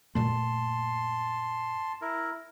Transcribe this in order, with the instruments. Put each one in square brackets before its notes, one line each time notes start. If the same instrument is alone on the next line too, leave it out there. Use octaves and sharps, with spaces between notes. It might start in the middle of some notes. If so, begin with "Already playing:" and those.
[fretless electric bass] F#2 A#2 A3 [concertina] A5 C6
[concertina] E4 A#4